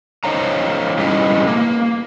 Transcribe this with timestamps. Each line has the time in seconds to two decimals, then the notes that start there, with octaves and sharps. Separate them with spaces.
0.24 D#4 C5 C#5 F5 A#5
0.98 G3 C#4 E4 G#4 B4 D#5
1.47 A#3